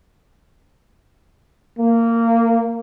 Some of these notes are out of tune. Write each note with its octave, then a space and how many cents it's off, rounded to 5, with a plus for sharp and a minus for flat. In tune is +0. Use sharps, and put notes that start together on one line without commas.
A#3 -20